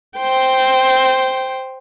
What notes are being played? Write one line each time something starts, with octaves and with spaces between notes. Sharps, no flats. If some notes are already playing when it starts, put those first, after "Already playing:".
C5 G5